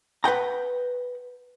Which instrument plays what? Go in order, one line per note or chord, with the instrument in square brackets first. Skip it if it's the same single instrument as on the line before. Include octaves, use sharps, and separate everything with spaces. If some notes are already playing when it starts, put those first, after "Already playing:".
[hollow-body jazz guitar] B4 F#5 G5 A#5